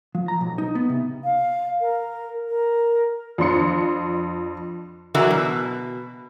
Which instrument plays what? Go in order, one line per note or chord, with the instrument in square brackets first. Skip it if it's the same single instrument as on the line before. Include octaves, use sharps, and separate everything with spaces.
[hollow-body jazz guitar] F3
A#5
B1
D#4
B3
C3
[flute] F5
A#4
A#4
[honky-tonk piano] F2 D4 C6 C#7
[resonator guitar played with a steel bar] D3 E3 F#3 E4 F#4 A#4
B2